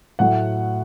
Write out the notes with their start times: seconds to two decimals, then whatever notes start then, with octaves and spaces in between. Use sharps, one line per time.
0.19 A2 F#3 A3 F#5